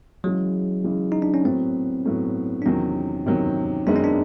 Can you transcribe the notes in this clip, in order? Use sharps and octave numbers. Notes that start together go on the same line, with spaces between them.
C#3 E3 F#3 G#3
C#3 E3 G#3
D#4
D4
C#4
A2 F#3 B3 C4
A2 F#3 B3
D4
E2 C3 D#3 F#3 C#4
E2 C3 D#3 F#3
F#2 D#3 G#3 B3 D4
C#4
D4